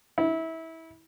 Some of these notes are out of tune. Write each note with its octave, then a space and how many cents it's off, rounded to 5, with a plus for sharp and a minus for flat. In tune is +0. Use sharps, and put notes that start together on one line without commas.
E4 -25